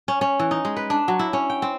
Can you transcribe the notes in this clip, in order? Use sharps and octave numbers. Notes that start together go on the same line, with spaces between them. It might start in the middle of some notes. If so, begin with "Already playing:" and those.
C#4
C#4
E3
D#4
G#3
B4
D4
F#3
E4
C#4
G5
C4